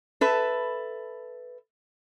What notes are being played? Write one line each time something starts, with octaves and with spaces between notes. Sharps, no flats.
A4 B4 E5